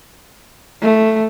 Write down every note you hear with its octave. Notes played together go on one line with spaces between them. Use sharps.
A3